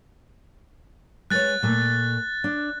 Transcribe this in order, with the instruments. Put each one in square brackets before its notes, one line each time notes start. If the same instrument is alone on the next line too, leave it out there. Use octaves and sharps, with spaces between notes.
[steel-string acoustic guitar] G#3 B4 C#5 [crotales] F#6 A6
[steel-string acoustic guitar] A#2 A3
D4